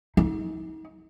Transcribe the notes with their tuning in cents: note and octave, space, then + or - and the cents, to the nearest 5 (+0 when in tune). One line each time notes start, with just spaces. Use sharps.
D#4 +40